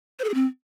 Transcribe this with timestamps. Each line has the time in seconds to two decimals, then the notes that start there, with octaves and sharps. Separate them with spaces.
0.19 C5
0.24 A4
0.29 G#4
0.34 C4